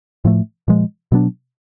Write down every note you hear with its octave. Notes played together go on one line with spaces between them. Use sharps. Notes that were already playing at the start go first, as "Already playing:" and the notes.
A2 F3 A3
A#2 F3 G#3
B2 F#3 B3 D4